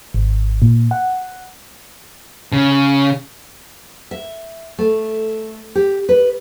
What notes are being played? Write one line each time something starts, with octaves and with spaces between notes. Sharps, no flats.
G#1
A#2
F#5
C#3
E5
A3
G4
B4